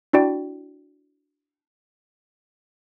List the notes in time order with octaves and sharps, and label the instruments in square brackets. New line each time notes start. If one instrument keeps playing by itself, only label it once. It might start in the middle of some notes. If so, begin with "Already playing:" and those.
[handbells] D4 E4 F#4 D5 G5